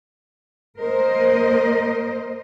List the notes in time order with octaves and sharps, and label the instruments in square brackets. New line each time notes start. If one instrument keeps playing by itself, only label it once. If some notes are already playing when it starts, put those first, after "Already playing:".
[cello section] A#3 A#4 C5 D#5